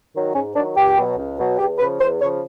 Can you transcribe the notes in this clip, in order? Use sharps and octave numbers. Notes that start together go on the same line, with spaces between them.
D#3 F#3
G#2 C#4
D#3 F#3 D4
C#2 G4
B2 F#3
C#2
B2 F#3
E2 G4
C#3 F3 B4
E2 C5
C#3 F3 C#5